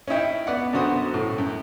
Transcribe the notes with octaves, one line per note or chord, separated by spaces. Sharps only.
C#4 D#4 E4 G5
B3 D5 F#5
F#2 D3 B3 F#4 C5 D#6
A2
F#2